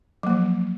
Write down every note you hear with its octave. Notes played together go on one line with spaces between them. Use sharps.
F3 F#3 A#3